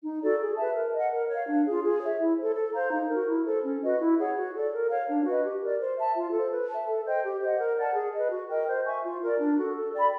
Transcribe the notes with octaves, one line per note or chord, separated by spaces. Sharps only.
D#4
F#4 A4 D5
G#4
B4 E5 A5
A#4
D#5 F#5
A#4
C#5 F5
D4
F4 G#4
G#4
C#5 E5
E4
A4 C5
A4
C5 F5 A#5
D#4
F#4 A#4
E4
A4 C5
C#4
F#4 B4 D#5
E4
G#4 C#5 F#5
F#4
A4 D5
A#4
C#5 F5
D4
F#4 B4 D#5
G4
A#4 D5
C5
E5 A5
F4
A4 C5
B4
E5 A5
A4
C5 D#5 G5
G4
C5 D#5 F#5
A#4
D5 F#5 A5
G#4
B4 D#5
F#4
A#4 D#5 G5
C5
E5 G#5 C#6
F4
A#4 D5
D4
F#4 A4
A4
D5 G5 B5